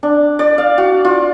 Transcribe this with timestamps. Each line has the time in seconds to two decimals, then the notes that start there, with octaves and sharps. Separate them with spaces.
0.03 D4
0.39 D5
0.58 F5
0.78 F#4
1.05 F4